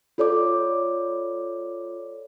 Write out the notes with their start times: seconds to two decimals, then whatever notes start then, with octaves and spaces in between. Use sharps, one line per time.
0.18 F4 A4 C#5 D5 D6